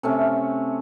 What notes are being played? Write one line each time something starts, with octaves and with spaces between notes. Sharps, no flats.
C3 A3 C#4